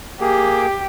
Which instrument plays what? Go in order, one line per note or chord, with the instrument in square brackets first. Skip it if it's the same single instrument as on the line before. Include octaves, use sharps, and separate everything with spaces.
[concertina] A#3 G#4 [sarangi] G4